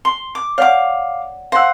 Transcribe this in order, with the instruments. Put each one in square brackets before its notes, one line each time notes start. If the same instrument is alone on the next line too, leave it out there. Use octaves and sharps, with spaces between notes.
[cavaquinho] C6
D6
[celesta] C#5 D5 F#5 [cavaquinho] F5 D6
[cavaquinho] C5 F#5 [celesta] F5 E6